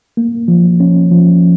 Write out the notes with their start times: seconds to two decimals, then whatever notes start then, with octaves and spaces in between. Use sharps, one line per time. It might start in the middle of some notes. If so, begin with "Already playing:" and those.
0.17 A#3
0.48 F3
0.80 C#4
1.11 F3